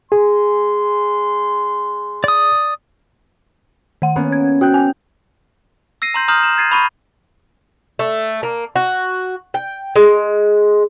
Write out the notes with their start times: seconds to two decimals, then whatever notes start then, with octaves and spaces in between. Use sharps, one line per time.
0.12 G#3 G#4 C6
2.24 D5 D#6
4.02 D#3 F#5
4.16 A#3 B3 C#4
4.32 G#6
4.61 F#4 G5 F#6 G6
4.74 G#5
6.02 E6 A#6 C7 D#7
6.14 A#5 C6 G6 C7
6.28 A#5 D#6 F6 G6 F#7
6.43 E7
6.58 G#6 A6 C7 D#7
6.71 B5 C#6 D#7
7.99 A3
8.43 A#3
8.76 F#4
9.54 G5
9.96 G#3